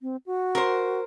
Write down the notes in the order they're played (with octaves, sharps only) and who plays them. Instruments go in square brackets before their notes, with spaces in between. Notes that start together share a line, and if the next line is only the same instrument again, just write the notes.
[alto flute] C4
F#4
[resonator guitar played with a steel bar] A#4 C5